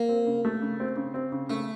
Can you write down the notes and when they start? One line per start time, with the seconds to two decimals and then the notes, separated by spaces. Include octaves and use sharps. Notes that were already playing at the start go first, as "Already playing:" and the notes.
Already playing: A#3
0.09 C4
0.27 C#3
0.45 A3
0.62 C#3
0.80 C4
0.97 C#3
1.14 C4
1.32 C#3
1.49 C#3 A3